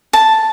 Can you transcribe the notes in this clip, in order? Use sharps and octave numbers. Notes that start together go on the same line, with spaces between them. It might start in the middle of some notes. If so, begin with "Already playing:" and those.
A5